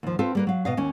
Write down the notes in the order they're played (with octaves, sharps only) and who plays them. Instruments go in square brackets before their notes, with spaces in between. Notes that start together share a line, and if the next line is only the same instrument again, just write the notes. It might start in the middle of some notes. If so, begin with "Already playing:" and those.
[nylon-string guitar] D#2 F3
C4 F4 A4 B4
G3 A#3 B4
F#3 F5
B2 D#5 F5
D#2 C#4